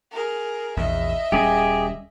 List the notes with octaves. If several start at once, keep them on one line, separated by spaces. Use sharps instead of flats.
G#4 A#4
A#1 E2 D#5 E5
D#1 G3 C#4 G4 G#4